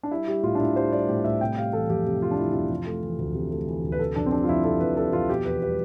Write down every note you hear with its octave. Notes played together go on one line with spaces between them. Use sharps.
D4
G3 E4
G3 G4
A2 F4
D4
A2 E4
G3 C5
G3 D5
A2 G4
A2 E5
C3 G5
G3 F5
E3 A4
F2 G4
C3
G3 F4
D4
E3 E4
F2 F4
C3
A3
E3
D2
C3
A3
E3
D2
B4
C3 A4
F2 D4
C4
G3 D4
F4
F2 E4
C3 A4
F2 B4
G3 A4
F2 F4
B2 G4
E2 B4
G3 B4